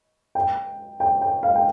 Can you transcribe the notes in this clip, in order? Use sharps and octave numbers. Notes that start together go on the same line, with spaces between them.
G5
G5
G5
F5
G5